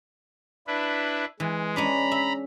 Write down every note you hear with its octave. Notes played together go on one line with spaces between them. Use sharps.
D4 E4 B4
E3 G#3
G#3 C#4 D4 A#5 B5
E5